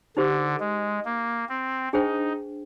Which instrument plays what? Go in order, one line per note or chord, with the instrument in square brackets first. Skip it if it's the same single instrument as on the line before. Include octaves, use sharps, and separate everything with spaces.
[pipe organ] D3 [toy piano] D#4 G4 C5
[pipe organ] G#3
A#3
C4
[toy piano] D4 G#4 C5 G5 [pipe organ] D#4